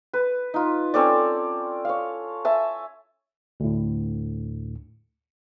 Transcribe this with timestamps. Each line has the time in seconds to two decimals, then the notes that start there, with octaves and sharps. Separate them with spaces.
0.13 B4
0.54 D#4 F4
0.94 C4 C#4 A4 D5
1.85 C#5 F5
2.45 E5 G#5 A5
3.60 D2 A2